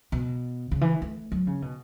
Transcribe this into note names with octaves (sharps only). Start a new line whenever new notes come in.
B2
C#3
E3
A3
F#3
C#3
B2